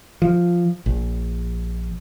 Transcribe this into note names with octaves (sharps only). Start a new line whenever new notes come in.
F3
A#1